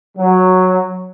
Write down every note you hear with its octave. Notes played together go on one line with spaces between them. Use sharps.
F#3